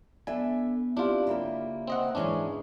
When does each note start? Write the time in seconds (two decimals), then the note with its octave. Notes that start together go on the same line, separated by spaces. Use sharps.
0.27 B3 D4 A4 E5 G#5
0.97 C4 D4 E4 F4 G4 D5
1.27 C#3 A#3 G4 E5 B5
1.88 C4 D#5 F#5
2.15 G#2 E3 G#3 C#4 D4 G#4